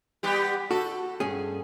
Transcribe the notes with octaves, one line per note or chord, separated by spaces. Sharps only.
G3 B3 G4
F#4 A4
G2 C#4 G#4